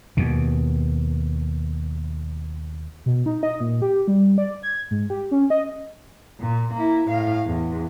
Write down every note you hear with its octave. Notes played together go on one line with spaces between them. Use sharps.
D#2 B2
B2
D#4
D#5
A#2
G4
G3
D5
G#6
G#2
G4
C#4
D#5
A#2
A#3 E4
A2 F5
E2